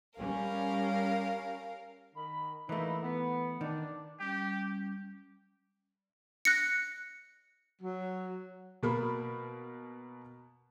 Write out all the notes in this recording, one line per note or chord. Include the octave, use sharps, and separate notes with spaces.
G3 C#4 A#4 F5
D#3 B5
E3 A3 A#3 D#4 E4
B3
D#3 D4
G3 C#4 G4 G5
F#6 A#6 C#7
F#3
B2 A#3 A#4 B5